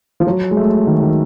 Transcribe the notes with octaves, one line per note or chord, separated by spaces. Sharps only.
F3
F#3
G#3
A3
D#3
D#3